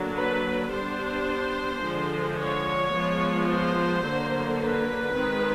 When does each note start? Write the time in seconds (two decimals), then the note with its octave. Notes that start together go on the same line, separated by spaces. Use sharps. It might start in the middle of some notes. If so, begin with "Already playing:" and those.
Already playing: D3 F#3 A#3 D4
0.16 B4
0.71 G3 B3 D4 C5
1.81 D3 F3 G#3
2.37 C#5
2.92 F3 G#3 B3
3.48 C5
4.04 D3 F#3 A#3
4.60 B4
5.15 D#3 G#3 C4